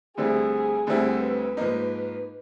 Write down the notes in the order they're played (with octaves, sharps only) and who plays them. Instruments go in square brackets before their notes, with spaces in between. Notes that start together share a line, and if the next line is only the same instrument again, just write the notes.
[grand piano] D2 D3 G3 C4 E4 [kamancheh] G#4
[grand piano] D2 D3 G3 C4 E4 [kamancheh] G#4
[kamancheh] B4
[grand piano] G#2 F3 A#3 D#4